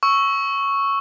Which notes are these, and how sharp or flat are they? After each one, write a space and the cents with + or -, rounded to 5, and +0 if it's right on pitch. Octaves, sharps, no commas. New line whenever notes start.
C#6 +0 E6 +0